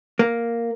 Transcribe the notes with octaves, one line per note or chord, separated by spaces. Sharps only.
A#3